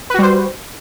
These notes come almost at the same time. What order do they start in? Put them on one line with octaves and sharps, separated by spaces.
B4 F#4 G3 C5